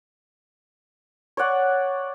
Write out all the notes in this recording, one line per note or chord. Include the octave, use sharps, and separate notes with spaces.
C#5 D5 F#5 C#6